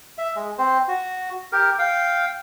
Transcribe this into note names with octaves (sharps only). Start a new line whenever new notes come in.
E5
G#3
C4 C5
F#4
G4 A#4
F5 G5